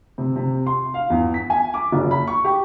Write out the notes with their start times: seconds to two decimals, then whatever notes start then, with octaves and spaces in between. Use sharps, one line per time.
0.18 C3
0.36 C3
0.67 C6
0.94 F5
1.10 E2
1.34 B6
1.50 G#5
1.74 D6
1.92 F#1
2.11 B5
2.27 C#6
2.44 G4